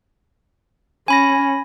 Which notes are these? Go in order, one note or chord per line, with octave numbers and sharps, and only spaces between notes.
C#4 G#5 B5 A#6